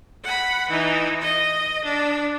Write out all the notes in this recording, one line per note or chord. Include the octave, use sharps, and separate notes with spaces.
F#5 B5
E3 D#4
D#5
D4